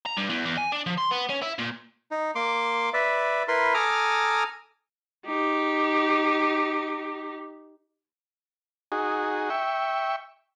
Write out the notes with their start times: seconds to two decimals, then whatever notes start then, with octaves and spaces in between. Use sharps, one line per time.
0.06 A#5
0.17 G2
0.30 E2
0.45 E2
0.57 G#5
0.72 D4
0.86 F3
0.98 C6
1.11 B3
1.29 C#4
1.42 E4
1.58 A#2
2.11 D#4
2.35 A#3 C6 D6
2.94 B4 D5 E5
3.48 E4 A#4 B4 C6
3.74 A4 G#5 A#5 D6 D#6 F6
5.26 D#4 G4
8.92 D#4 F#4 G#4
9.50 E5 G5 C#6